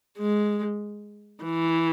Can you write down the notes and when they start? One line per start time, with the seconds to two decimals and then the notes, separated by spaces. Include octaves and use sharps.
0.18 G#3
1.44 E3